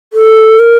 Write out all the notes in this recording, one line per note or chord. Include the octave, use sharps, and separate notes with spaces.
A4
A#4